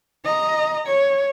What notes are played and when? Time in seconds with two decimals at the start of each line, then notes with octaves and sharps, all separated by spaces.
0.25 D#5 A#5
0.86 C#5